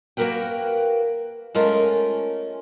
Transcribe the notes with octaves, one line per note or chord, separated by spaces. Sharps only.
A#3 F#4 G4 A#4 B4 G5
G#3 A3 C#4 F4 A#4